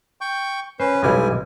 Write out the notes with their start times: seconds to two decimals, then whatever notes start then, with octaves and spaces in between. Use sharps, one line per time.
0.21 G5 C#6 G6
0.80 C#4 B4 C5
1.03 B1 F2 G3 G#3 E4 G#5